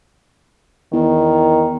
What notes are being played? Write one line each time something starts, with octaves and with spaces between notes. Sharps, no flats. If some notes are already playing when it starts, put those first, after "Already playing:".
E2 D#3